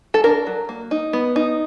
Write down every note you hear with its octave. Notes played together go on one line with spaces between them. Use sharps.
A4
D4 A#4
F#3
A#3
D#4
B3
D#4